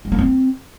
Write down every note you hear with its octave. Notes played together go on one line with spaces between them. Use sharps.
G#3
A#3
C4